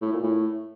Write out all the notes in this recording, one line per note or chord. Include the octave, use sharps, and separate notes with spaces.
A2
A#2
A2